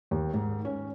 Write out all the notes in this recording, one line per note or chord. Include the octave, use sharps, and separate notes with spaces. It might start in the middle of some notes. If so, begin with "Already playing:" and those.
D#2
G#2
C#4